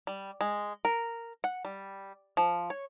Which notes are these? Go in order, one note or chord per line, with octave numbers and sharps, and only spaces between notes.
G3
G#3
A#4
F#5
G3
F3
C#5